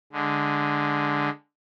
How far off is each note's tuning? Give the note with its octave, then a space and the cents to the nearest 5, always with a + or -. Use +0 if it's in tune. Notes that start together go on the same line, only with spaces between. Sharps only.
D3 +0 G#3 +0